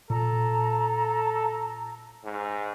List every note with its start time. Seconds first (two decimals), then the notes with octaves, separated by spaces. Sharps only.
0.10 A#2 A4 A#5
2.24 G#2